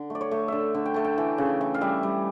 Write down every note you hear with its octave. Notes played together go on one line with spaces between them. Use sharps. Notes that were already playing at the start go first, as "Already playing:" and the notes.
Already playing: D3
A3 D5
C#5
A3
D3 D5 E5
D3
G5
A3 A5
G5
E3
C#3
E3
F5
G3 E5
G3